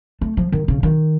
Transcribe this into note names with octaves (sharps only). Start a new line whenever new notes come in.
A3
F3
D#3
C#3
D#3